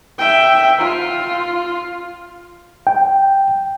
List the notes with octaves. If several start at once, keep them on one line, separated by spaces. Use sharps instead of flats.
E5 G5
F4
G5